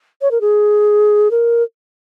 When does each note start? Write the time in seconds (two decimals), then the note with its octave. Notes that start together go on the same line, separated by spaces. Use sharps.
0.22 C#5
0.31 A#4
0.41 G#4
1.31 A#4